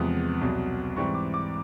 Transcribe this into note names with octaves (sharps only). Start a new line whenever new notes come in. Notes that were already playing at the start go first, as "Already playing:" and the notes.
Already playing: E2 C3 F3 G#3 B3 D#6
C2 B2 F#3
G#2 E3 G3 C4 C#6
D6
D6